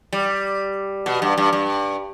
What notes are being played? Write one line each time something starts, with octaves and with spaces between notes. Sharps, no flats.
G3
B2
G2
G2
G2